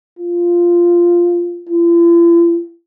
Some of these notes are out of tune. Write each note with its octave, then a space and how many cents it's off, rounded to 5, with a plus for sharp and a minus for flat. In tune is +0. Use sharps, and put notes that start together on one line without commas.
F4 -5
F4 -45